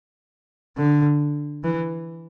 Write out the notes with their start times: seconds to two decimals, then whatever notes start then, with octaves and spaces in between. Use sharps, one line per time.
0.77 D3
1.64 E3